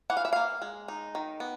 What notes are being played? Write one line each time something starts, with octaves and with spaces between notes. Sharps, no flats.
E3 F#5
F5
E5
A#3 F5
G#3
D#4
D#3
B3